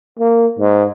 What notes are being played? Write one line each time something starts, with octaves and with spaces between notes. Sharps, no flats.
A#3
G#2